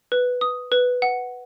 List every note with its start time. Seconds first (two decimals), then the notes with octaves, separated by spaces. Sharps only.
0.12 B4
0.41 D#6
0.72 B4
1.02 F#5